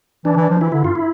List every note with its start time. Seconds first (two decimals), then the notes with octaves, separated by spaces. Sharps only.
0.25 E3 D4
0.37 E3
0.49 F3
0.61 E3 E4
0.72 D3 E4
0.84 G2 F4
0.95 E4